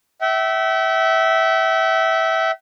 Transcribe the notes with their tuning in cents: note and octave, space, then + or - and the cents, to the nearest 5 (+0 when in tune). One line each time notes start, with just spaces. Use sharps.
E5 -15 G5 -45